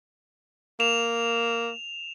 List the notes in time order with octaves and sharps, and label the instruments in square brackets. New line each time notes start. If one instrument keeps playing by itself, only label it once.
[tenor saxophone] A#3 [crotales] E7 F7